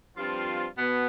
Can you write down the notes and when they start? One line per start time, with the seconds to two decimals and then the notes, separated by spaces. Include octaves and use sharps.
0.17 G2 F3 C4 F4
0.77 B2 B3